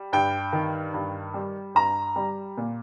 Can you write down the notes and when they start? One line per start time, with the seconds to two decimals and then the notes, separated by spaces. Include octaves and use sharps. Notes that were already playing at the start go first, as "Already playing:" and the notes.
Already playing: G3
0.13 G2 G5
0.53 D#3
0.94 G2
1.34 G3
1.75 G2 A#5
2.16 G3
2.57 A#2